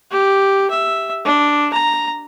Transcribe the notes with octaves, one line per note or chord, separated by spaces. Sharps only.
G4
E5
D4
A#5